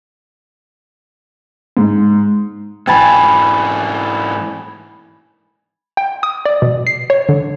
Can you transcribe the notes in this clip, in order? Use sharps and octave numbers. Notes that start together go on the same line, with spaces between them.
G#2
G#2 E3 G#5 A5 B5
G5
D#6
D5
B2
C7
C#5
D3